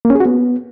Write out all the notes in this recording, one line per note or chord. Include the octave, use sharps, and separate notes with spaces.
A#3
C#4
G#4
F#4
B3